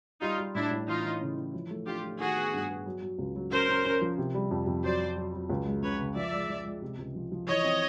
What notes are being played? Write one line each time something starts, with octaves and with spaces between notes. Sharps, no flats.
G3 D#4 F4
G3
A2 D4 E4
A2
E3 D#4 F4
E3
C#3
E3
F3
A3
D4 F4 G4
A3
D#3 F#4 G#4
B3
G2
B3
F#3
F#3
C#2
F#3
C#4 A#4 C5
C#4
C#4
F3
C3
G3
F2
F2
F#3 C5 D5
F#3
F#3
F#3
C#2
G#3
C#3 B4 C#5
C#3
F3 D5 E5
G#3
F3
G#3
C3
C#2
F3
F3
E3 C#5 D#5
C4